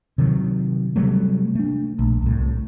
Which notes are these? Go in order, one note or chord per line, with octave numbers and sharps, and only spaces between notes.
C3 D#3 F#3
C3 F#3 G3 A3
A3 D4
A#1
C2 A2